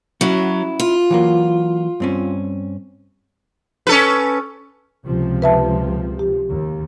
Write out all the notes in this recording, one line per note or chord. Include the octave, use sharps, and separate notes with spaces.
F#3 C#4 E4 F#4
F4
E3 F#3 A#3
G2 C4 C#4
C#4 A4 B4
C#2 C3 F3
B4 E5 A5
G4
D#2